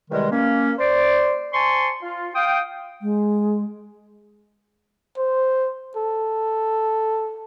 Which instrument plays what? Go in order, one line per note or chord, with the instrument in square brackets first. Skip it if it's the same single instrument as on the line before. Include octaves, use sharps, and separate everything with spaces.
[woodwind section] E2 C3 D#3 G3 G#3
A#3 C#4
C5 D5
C5 G#5 A5 C6 C#6
F4
F5 G5 D#6
[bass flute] G#3
[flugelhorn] C5
A4